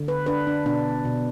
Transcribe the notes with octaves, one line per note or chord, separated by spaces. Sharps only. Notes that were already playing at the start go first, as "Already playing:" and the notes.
Already playing: D3
B4
D4 B4
D4
B2 D4
B2